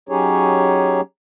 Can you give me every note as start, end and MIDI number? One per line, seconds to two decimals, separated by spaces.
0.09 1.01 54
0.09 1.01 61
0.09 1.01 63
0.09 1.01 67
0.09 1.01 68
0.09 1.01 73